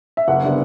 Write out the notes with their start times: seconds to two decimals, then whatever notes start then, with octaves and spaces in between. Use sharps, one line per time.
0.17 E5
0.28 F#1 F#5
0.44 D3 G3 B3